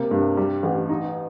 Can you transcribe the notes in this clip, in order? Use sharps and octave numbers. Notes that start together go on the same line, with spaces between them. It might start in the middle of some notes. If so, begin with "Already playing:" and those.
Already playing: C3 A#3
G2
G3
A1
D#4